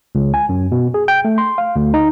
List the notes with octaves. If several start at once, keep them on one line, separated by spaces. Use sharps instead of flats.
C#2
G#5
F#2
B2
G#4
G5
A3
C6
F5
D2
D#4